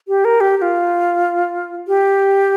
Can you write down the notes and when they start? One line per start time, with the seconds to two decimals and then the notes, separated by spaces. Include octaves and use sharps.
0.08 G4
0.25 A#4
0.41 G4
0.57 G4
0.62 F4
1.88 G4